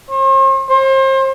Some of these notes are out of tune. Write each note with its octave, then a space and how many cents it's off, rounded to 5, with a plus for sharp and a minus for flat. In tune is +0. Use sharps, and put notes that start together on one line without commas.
C5 +45
C5 +35